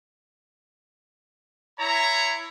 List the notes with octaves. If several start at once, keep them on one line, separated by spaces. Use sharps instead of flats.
E4 C#5 A#5